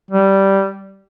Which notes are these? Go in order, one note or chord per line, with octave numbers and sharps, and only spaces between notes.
G3